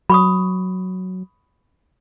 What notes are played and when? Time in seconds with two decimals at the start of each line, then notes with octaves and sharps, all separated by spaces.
0.10 F#3 B5 C#6 D#6